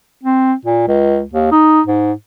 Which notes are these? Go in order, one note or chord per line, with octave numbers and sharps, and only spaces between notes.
C4
A#2
C#2
D#2
D#4
G#2